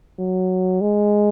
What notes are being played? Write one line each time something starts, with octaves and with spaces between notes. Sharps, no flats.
F#3
G#3